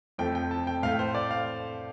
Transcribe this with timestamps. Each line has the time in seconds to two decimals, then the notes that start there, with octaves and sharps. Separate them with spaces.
0.18 F2 F3 A3 G5
0.35 G5
0.51 A5
0.67 G5
0.83 A2 A3 F5
0.99 C5
1.15 D5
1.31 F5